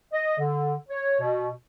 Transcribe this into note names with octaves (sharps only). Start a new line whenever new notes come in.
D#5
D3
C#5
B2